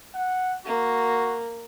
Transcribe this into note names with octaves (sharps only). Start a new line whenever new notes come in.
F#5
A#3 F#4